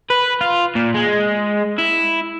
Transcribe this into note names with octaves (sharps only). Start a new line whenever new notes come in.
B4
F4
A#2
G#3
E4